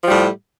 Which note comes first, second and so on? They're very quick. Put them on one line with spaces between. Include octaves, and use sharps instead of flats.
F3 G3 A2